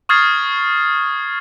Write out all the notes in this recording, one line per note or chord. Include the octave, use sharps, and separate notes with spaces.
C#6 D#6 F6 G#6 A6 C7